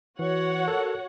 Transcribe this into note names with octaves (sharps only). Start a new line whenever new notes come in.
E3 F#4 C#5 F#5
A4 A#4